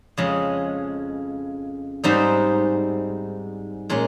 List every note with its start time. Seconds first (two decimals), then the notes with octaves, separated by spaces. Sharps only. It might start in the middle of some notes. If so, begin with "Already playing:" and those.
0.17 F2 C#3 G#3
2.04 G#2 G3 C4 D#4
3.90 A#2 G#3 C#4